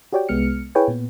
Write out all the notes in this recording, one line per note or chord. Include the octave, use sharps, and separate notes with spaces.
F#4 G4 C#5 D5 G5
C2 G#3 B3 F6 C#7
E4 G#4 B4 C#5 G5 G#5
A#2 B3